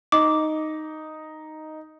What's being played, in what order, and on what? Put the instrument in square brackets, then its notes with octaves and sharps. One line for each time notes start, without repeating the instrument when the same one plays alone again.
[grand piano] D#4 [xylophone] D6